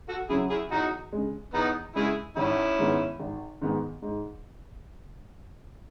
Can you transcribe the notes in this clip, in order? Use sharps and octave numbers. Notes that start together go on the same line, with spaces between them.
F#4 A4
C#3 F#3 C#4 E4 G#4
E4 G#4
E2 D#4 F#4
C#3 G#3
E2 B3 D#4
C#3 G#3 E4 G#4
G#1 C#4 E4
G#2 D#3 G#3 B3
G#1
G#2 D#3 G#3 B3
G#2